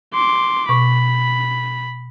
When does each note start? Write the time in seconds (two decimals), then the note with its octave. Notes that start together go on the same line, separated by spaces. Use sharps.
0.13 C6 D6
0.69 B2 B5 C#6